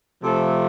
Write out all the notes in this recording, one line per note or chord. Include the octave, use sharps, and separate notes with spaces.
C3 F3 A3 A4